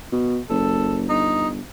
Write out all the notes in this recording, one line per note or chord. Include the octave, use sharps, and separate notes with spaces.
B2
F#1 A4
G1 D#4